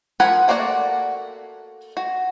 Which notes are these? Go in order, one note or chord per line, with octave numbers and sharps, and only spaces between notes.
F3 A#4 F#5 G#5 B5
A3 A#3 F#4 D5 F#5
F#4